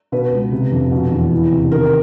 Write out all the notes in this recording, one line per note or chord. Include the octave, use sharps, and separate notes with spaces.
B2 B4
C#2
C3
F2
B2
E2
E3
C3
D#3 A#4